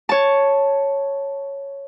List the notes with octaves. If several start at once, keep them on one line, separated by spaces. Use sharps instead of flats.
C#5 A5